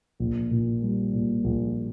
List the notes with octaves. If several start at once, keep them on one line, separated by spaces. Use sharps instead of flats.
A#1
A#2
G3
A#2
A#1